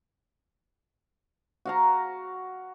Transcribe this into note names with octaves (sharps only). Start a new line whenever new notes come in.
F#4 F5 A#5